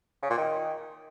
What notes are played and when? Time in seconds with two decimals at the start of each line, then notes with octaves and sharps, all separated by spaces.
0.22 C#3
0.30 A#2
0.38 D#3